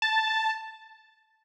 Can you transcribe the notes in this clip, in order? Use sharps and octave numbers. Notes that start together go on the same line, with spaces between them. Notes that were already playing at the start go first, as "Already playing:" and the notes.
A5